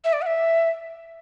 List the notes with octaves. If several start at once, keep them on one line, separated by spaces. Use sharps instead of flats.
E5
D5
F#5
E5